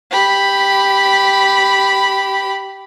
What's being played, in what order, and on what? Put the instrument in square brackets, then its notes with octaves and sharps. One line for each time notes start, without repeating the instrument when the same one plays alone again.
[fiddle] G4 B5